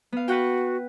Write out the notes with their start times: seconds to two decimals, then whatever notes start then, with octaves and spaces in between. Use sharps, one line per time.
0.12 B3 F5
0.28 F#4 B4 F#5 G5